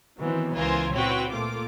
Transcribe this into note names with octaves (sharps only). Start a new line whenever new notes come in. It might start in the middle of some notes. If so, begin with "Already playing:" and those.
D#3 E3 F#3 B3 C4
C#2 E3 F4 A#4 C5 G#5
A#2 C4 E4 F#4 B4 C#5 G5
A#2 A3 A#3 F4 D6